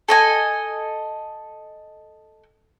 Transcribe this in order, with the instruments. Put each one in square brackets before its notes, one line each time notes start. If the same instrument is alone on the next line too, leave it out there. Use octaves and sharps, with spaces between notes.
[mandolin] A4 D#5 G#5